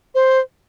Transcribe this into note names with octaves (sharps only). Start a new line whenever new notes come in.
C5